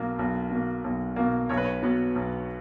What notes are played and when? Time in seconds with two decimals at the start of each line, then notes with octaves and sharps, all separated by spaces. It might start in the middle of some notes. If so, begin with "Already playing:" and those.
Already playing: B1 B2 A#3
0.19 B1
0.51 B2 A#3
0.84 B1
1.16 B2 A#3
1.49 B1 C#5
1.57 B4
1.65 C#5
1.83 B2 F#3 B3
2.16 B1